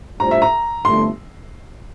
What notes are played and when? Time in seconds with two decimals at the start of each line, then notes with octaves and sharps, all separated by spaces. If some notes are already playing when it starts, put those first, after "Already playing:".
0.20 A2 G3 D4 F4 C5 A#5
0.31 E5
0.42 A#5
0.85 G1 F2 D3 A3 E4 C6